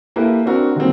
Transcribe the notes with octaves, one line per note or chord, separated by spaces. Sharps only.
A#3 E4 G4 A4 B4
C4 D4 F#4 A#4
D3 D#3 F#3 G3 A#3 C4